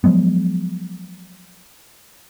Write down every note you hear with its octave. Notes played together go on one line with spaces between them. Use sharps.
F3 F#3 G#3 B3